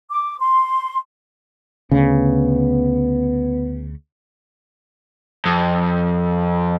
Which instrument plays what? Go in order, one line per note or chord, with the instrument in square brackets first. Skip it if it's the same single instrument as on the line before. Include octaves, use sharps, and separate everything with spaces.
[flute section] D6
C6
[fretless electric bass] D2 C#3 [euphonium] B3
[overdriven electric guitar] F2